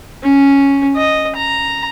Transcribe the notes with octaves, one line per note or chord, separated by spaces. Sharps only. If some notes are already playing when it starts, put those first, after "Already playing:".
C#4
D#5
A#5